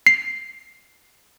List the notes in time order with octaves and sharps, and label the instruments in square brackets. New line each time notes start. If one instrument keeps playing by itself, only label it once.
[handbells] C7